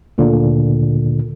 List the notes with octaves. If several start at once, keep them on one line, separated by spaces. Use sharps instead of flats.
D2 A#2 D3